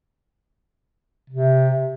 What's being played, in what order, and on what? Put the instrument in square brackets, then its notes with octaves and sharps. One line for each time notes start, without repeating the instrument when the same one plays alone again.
[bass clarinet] C3